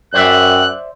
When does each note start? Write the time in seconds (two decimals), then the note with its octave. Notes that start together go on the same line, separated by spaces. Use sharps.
0.14 F#2 C5 D5 E5 G5 F#6